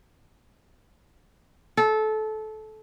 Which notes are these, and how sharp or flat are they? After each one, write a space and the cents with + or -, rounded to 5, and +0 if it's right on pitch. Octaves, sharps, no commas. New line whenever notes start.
A4 -20